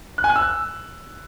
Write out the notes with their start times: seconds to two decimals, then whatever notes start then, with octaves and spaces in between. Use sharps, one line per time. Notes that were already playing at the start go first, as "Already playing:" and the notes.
0.18 F#6
0.24 G#5
0.30 F#6
0.36 E6